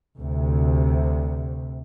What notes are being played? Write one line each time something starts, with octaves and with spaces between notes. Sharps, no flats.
D2 C3